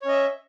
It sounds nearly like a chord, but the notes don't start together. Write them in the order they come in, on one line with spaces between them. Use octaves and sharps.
C#5 C#4 D#5 E5